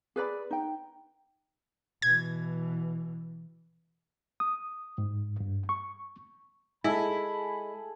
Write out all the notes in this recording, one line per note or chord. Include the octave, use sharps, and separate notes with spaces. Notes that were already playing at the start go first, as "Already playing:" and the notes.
G#4 B4 D5 B5
D#4 G5
B2 E3 G#6
D#6
G#2
G2
C#6
G#3 E4 G#4 A4 B5